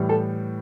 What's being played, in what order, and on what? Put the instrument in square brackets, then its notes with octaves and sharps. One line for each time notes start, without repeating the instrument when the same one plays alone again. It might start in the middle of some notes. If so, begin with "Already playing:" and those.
Already playing: [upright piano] A2 E3 G3
A4